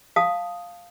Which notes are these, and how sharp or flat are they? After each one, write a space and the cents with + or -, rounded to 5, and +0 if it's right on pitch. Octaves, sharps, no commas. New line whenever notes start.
F5 +0 A5 +0 D#6 +0